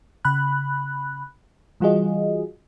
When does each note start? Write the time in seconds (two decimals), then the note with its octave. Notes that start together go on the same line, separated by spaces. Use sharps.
0.25 C#3 B5 F#6
1.80 E3 G3 F4 F#4 G#4 D#5